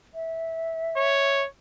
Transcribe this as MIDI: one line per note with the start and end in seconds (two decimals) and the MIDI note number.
0.15 1.42 76
0.97 1.46 73